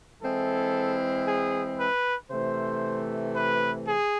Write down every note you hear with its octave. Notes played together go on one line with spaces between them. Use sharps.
E3 G#3 C4 E4 A4
G#4
B4
C3 E3 A3 C5
B4
G#4